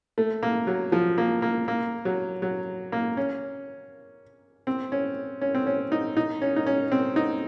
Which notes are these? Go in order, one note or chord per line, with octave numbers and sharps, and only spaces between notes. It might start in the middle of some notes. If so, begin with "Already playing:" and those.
A3
A#3
F#3
F3
A#3
A#3
A#3
F#3
F#3
A#3
C#4
C4
C#4
C#4
C4
C#4
D#4
D#4
C#4
D#4
C#4
C4
D#4